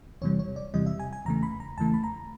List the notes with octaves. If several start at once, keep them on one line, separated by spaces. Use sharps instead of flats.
E2 C3 E3 G3 C#5
C#5
D5
E2 C3 E3 G3 D#5
E5
G#5
G#5
E2 C#3 E3 A3 A#5
B5
A#5
E2 C#3 E3 A3 A5
B5
A#5